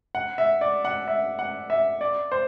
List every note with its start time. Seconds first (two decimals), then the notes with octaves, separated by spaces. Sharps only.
0.15 F#5
0.38 E5
0.61 D5
0.85 F#5
1.08 E5
1.39 F#5
1.70 E5
2.01 D5
2.32 C5